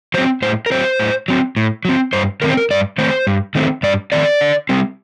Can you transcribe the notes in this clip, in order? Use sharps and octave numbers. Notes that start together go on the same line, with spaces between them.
F#3 C4 C5
A2 C5
A#4
F#3 C4 C5
A2
F#3 C4
A2
F#3 C4
G2 C5
D#3 A3 C4 A#4
C5
A#4
G2 D5
D#3 A3 C4 C5
G2
D#3 A3 C4
G2 D5
D#3 A3 C4 D5
D3
G3 C4